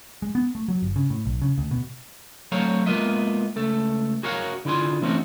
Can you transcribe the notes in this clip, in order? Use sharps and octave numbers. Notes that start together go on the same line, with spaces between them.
G#3
B3
A3
F#3
G1
C#3
A2
B1
C#3
D2
B2
F#3 A3 C4 C#5 F5 A#5
G#3 A#3 B3 F4 D#5 E5
C#2 A3 A4
F#4 G#4 A#4 C#5 F5 F#5
D3 E4 F4 G#4 C6
E3 A3 C4 C#4 D#4 F#4